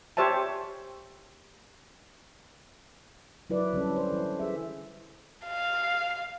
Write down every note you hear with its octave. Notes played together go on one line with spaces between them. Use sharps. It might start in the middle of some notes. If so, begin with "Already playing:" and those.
G4 C5 C#5 E5 A5
F#3 E4 B4 D5
D3 G3 C#4 A4
C5
E3
G#4 E5
F5